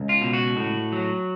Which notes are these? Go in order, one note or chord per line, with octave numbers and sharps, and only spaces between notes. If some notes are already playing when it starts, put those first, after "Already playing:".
Already playing: C#2
F4
B2
F#4
A2
F#3